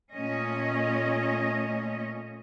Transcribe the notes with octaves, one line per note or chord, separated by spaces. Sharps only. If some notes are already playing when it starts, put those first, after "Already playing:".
A#2 A3 C#4 D#5